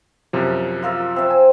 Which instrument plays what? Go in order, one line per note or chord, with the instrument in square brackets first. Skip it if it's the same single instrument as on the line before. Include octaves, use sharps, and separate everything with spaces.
[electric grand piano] F#2 C3 F3
[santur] F4 A#4 E5
C4 E5
[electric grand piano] G#5